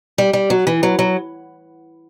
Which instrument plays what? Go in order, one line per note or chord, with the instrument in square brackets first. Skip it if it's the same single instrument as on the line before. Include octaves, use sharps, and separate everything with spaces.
[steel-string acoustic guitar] G3
G3
F#3
E3
F#3
F#3